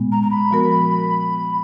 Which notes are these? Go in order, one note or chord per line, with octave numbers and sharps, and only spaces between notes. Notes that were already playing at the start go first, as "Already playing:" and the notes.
Already playing: A#2 G#3 B3
A#5
A#5
B5
F3 B3 F#4 A#4